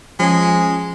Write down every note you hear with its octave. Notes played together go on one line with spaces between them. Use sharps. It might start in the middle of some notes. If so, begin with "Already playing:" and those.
F3 G#3 C#4 G#5